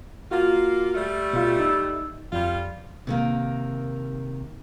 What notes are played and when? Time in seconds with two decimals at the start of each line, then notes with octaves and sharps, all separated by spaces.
0.31 A#3 F4 F#4
0.95 G3 A3
1.33 B2 F4
1.60 D#4 E6
2.32 F2 G3 F4
3.07 C3 D#3 A#3